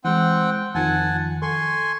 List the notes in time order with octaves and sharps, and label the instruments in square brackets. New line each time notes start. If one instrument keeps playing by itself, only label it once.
[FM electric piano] E3 G#3 [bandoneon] C4 F#5 G5
[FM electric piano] F2 D#3 F3 [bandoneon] F#5 G#5 A5
[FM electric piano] A4 [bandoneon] G#5 C6 C#6